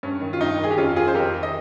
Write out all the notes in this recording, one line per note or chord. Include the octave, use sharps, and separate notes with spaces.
G2 C#4
D#3
F4
G2 D#4
D#3 G#4
G4
F2 C#4 F4
D#3 F4 G#4
C5
F2 G4 A#4
D#3
D#5